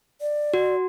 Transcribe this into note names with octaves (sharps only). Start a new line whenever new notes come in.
D5
F#4